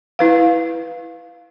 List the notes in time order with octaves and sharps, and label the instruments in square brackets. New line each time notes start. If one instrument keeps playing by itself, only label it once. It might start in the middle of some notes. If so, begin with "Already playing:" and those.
[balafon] E4 B4 F5